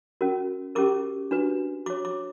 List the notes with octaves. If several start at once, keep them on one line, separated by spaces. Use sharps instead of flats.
C#4 F#4 A#4
C#4 G4 A#4 D6
D4 F#4 B4
F#4 C#5 D6
D6